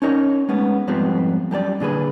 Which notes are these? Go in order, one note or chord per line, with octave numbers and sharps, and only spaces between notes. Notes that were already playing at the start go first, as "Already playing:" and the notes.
C#4 D#4 A#4 C#5
G#3 A3 B3 C#4
F2 G#2 F3 G3 B3 C4
F#2 G3 A4 D5
A#2 D3 G#4 B4